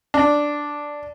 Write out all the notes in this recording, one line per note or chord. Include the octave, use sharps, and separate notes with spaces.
D4